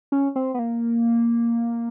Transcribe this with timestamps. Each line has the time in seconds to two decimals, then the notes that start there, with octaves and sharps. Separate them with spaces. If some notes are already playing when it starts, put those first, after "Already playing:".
0.12 C#4
0.36 C4
0.54 B3
0.59 A#3